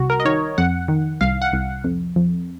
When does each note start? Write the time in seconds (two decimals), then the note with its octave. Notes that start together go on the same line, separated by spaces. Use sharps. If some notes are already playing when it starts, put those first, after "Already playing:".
Already playing: C2 F#4
0.10 A#4
0.20 D#5
0.25 D#3 C#5
0.58 F2 F#5
0.88 D#3
1.21 C2 F5
1.42 F#5
1.53 C2
1.84 F2
2.16 F2